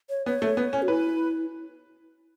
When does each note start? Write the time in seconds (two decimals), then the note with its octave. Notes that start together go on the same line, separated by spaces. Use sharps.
0.10 C#5
0.26 B3 C#5
0.42 A3
0.57 B3
0.73 C#4
0.82 F#4
0.88 E4 B4